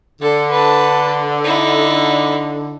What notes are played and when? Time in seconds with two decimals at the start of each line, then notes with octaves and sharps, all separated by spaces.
0.21 D3 A4
0.51 B4 A5
1.44 D#4 E4